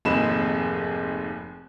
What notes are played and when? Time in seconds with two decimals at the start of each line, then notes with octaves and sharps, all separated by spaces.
0.05 F1 D#2 G#2 G#3 B5 E7